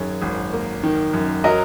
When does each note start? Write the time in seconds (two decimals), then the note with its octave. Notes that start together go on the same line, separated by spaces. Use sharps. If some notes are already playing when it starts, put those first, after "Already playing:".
Already playing: F#2 D#3 G#4 C#5
0.22 G#1
0.53 A#3
0.83 D#3
1.13 F#2
1.44 F#3 A#4 D#5